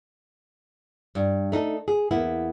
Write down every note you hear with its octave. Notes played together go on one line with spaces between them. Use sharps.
G2
A3 D#4 G#4 A4
G#4
E2 A#3 B3 E4